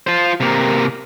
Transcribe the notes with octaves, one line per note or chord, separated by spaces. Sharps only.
F4 C5
C3 A#3